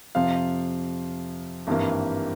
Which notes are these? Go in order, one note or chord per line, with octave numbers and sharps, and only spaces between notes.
F2 C3 F3 F5
G#1 G2 E3 G3 A#3